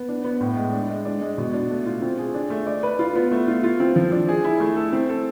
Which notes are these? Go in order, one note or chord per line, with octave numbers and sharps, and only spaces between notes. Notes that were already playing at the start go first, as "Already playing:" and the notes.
Already playing: B3
D4
B3
A2
G#3
D4
G#3
D4
G#3
B2
D4
A3
F4
C4
G#4
D4
A3
D5
B4
F4
B3
A3
F4
F4
C4
F3
D4
G#4
E4
A3
A4
C4
A4